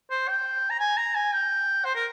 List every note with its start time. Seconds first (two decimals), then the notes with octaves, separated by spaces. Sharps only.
0.10 C5
0.28 G5
0.70 A#5
0.79 G#5
0.97 A#5
1.15 G#5
1.33 G5
1.85 C5
1.95 A#4